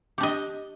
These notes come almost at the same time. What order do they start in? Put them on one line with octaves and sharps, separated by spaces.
G4 D4 D#5